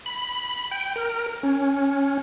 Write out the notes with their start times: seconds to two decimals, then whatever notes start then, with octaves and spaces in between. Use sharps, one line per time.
0.06 B5
0.71 G5
0.96 A#4
1.43 C#4